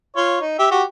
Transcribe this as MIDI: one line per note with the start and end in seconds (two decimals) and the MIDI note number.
0.16 0.40 65
0.16 0.40 73
0.41 0.57 63
0.59 0.66 67
0.59 0.66 76
0.71 0.83 66
0.71 0.83 67